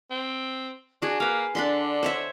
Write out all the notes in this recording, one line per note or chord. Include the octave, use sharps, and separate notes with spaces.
C4
D4 F#4 G#4
A#3 B4 F5
D3 D4 B5 C6
C5 C#5 E5